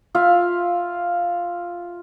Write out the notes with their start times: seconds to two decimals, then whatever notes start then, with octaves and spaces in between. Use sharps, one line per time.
0.15 F4 E5 F5